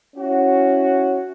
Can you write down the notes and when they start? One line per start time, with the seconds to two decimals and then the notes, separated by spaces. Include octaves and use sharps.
0.16 C#4 E4 F#4